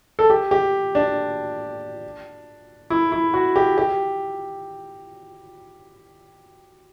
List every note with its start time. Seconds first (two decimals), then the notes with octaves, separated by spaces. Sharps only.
0.19 A4
0.30 G4
0.51 G4
0.95 D4
2.90 E4
3.12 E4
3.34 F#4
3.56 G4
3.78 G4